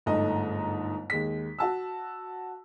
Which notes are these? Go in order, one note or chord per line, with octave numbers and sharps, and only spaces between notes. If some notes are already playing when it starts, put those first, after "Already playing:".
G1 G#2 A3 D#5 A#5
D#2 G#3 B6
F#4 A5 E6